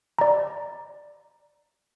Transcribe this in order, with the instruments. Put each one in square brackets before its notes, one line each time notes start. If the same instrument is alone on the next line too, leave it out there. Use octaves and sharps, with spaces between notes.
[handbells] D5 A#5